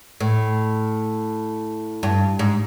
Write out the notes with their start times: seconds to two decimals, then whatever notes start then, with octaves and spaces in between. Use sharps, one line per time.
0.20 A2
2.03 G2
2.39 G#2